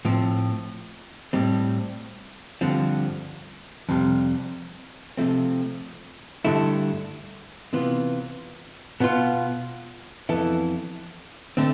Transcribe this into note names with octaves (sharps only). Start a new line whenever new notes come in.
A2 F3 C4
A2 G3 C4
G2 D3 F3 C4
F2 C3 G3
C3 F3 A3 C4
G2 D3 A3 E4
C3 E3 B3 F4
B2 B3 F4
F2 E3 B3 E4 A4
D3 A3 C4